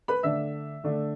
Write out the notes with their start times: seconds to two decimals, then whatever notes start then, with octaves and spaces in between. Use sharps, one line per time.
0.08 B4 B5
0.23 D3 A3 D4 E5 E6
0.84 D3 A3 D4